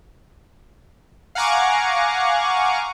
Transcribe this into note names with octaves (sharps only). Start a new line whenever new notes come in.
F5 F#5 G#5 A#5 C#6 D6